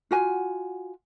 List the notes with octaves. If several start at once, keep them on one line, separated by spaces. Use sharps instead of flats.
F4 F#4 G#5